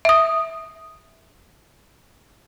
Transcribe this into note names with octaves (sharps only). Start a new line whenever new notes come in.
E5 D#6